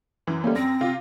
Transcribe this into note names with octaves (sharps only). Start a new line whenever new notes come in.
F#2 E3
G3 A3 A#3 C#4
F#2 C4 A#6
C3 F4